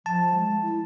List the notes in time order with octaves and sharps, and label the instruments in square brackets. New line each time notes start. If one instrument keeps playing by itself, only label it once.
[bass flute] F3 [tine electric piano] A5
[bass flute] G#3
E4